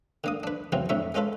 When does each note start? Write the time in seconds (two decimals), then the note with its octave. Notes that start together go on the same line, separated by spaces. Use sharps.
0.24 D3 A#3 D#6
0.43 D4 B4
0.72 E2 C#3 E3 F#3 C4
0.89 F2 A2 D3 E5 C#6
1.14 G#3 C#4 F4 A4 B4